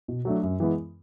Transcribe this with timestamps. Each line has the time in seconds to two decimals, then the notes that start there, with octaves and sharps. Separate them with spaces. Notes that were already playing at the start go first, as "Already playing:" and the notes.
0.08 B2
0.25 F#3 A3 D4
0.43 F#2
0.60 E3 G#3 B3